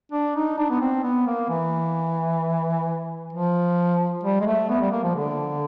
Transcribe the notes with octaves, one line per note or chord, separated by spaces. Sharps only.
D4
D#4
D4
B3
C4
B3
A#3
E3
F3
G3
G#3
A3
B3
G3
A#3
F3
D3